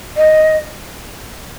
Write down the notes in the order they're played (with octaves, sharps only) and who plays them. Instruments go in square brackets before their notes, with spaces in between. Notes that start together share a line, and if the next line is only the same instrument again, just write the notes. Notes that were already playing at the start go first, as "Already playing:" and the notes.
[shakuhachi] D#5